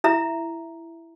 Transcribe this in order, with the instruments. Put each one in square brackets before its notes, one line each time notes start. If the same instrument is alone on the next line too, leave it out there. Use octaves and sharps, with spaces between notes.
[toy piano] E4 E5 A#5